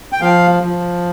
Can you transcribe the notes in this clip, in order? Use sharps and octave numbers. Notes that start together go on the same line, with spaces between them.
G5
F3 F5
F3